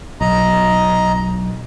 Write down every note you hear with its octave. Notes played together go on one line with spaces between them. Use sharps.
B1 D#5 A#5